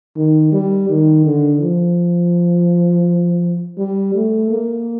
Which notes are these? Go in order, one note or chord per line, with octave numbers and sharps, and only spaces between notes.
D#3
G3
D#3
D3
F3
G3
A3
A#3